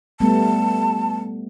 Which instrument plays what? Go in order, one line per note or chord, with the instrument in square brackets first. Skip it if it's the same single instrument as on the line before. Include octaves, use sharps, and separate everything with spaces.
[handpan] G3 A3 B3 [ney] A5